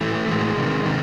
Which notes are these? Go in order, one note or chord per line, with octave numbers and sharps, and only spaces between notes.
A2 E3 A3
A3
A2 E3 G#3
C3 D#3
C3 D#3